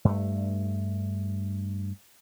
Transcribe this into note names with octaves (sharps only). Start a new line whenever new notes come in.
G2 A3